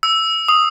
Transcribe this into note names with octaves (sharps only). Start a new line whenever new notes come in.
E6
D#6